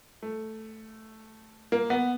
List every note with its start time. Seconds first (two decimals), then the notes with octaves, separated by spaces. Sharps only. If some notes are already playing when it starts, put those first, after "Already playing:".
0.23 A3
1.72 A#3
1.90 B3